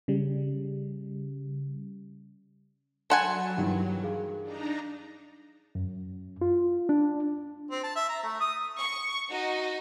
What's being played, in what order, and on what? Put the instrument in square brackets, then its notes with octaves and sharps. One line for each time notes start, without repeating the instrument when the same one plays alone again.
[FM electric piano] C#3 G3
[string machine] F#3 [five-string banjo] A4 F#5 G#5 [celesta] B5 C6 E7
[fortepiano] G2 D#3 E3
[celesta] G#4 F5
[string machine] D4 D#4 A#5
[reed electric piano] F#2
F4
D4
[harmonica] C4
A5
E5
A#5
A3
D#6
[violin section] C#6
D#4 F#4 D#5